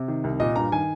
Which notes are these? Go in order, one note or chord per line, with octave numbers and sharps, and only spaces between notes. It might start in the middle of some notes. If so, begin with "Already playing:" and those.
Already playing: C3
D#3
C2
A#2 D#5
G2 A#5
D#3 G#5